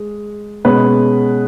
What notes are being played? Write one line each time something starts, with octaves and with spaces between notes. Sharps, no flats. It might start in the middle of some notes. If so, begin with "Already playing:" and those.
Already playing: G#3
B2 G#3 C#4 B4